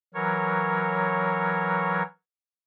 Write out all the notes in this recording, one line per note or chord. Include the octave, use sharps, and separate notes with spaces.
E3 F#3 A#4 C#5